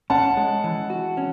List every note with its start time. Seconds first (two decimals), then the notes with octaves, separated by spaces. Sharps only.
0.10 C#4 F#5 A5
0.37 G#3
0.64 E3
0.90 F#4
1.17 C#4